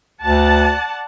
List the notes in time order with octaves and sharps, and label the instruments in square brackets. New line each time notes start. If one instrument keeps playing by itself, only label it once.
[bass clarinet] D2 [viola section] D5 F#5 A5